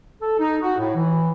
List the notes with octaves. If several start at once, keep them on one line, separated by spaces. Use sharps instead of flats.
A4
D#4
F#4
A2
E3